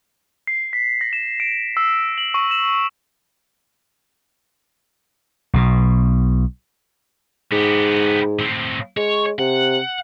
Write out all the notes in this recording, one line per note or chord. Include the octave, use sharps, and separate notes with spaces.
C7
B6
A#6
E7
D7
E6
F#7
C#6
E7
B1 B2
G#2 B3 G4
A2 C4
G#3 C#5
C3 F#5